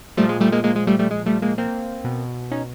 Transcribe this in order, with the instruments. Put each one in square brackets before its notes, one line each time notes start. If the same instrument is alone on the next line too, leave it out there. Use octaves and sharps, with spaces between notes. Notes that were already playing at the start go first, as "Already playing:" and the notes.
[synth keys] A#2 F3 G3 A3
G#3
G3 A3
G#3 A#3
G#3 A#3
G#3
G3 A3
G3 A3
G#3
G3 A3
G#3 A#3
A#3 C4
B2
C#4 D#4